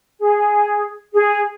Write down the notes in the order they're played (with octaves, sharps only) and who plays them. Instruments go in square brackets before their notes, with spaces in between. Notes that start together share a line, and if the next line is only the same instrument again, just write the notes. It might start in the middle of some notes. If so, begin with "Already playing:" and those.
[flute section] G#4
G#4